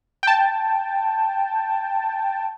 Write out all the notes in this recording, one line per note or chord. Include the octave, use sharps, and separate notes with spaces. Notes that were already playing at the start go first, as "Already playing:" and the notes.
G5 A5